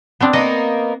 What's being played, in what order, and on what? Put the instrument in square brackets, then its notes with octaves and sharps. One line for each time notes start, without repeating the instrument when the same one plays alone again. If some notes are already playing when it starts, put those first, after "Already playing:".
[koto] B3 C4 D4
[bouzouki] A#3 B3 D#4 [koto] D#5